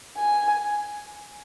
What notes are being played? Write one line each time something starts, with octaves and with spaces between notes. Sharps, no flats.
G#5